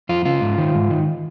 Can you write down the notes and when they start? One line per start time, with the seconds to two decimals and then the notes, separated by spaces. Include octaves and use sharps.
0.09 F2 F4
0.25 C#3 F4
0.41 G#2
0.58 D#3
0.75 G#2
0.90 D#3